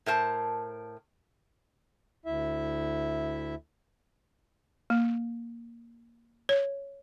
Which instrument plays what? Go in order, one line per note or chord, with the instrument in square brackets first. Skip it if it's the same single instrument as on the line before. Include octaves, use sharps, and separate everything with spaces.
[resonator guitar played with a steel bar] A2 A#4 C5 A5
[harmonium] D2 E4 E5
[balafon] A#3
C#5